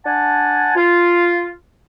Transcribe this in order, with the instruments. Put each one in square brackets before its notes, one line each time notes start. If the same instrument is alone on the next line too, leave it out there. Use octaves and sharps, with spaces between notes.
[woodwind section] D4 F#5 G#5 A5
F4